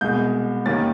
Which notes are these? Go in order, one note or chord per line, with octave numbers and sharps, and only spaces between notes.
C2 B2 G#3 G6
D#2 D#3 G3 A#3 C#4 A6